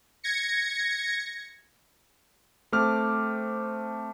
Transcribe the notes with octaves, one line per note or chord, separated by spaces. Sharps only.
G#6 A#6 C#7
A3 C4 D6 F6